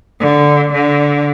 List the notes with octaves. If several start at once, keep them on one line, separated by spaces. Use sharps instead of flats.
D3
D3